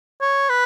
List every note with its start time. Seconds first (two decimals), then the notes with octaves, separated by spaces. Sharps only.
0.21 C#5
0.49 B4